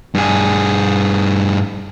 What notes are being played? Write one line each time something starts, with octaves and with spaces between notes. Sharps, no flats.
G2 G#4